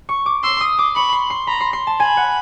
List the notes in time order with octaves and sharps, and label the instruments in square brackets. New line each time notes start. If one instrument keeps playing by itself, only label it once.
[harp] C#6
D6
[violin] C6 [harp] E6
[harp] D#6
D6
[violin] B5 [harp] C#6
[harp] C6
C6
[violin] A#5 [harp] B5
[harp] C6
C6
A5
[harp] G#5 [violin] B5
[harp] F#5